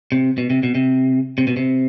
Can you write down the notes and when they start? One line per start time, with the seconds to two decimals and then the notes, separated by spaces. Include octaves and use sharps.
0.12 C3
0.38 B2
0.50 C3
0.63 B2
0.75 C3
1.38 C3
1.47 B2
1.57 C3